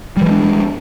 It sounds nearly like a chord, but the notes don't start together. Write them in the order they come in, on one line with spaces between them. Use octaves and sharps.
G3 E3 G#3 D4